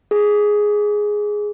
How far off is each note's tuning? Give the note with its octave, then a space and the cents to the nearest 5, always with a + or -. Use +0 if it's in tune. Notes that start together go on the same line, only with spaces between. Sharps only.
G#4 +0